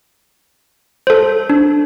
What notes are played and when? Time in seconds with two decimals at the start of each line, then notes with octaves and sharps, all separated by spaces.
1.07 A4 C5
1.50 D4